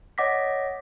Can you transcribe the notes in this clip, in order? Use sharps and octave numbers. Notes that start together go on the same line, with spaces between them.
C#5 D#5 F#5 D6 A#6 B6